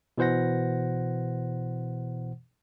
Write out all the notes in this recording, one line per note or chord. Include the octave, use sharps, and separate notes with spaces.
B2 E3 C5 F#5 A#6